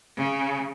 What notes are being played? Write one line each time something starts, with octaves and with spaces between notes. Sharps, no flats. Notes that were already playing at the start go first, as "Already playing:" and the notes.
C#3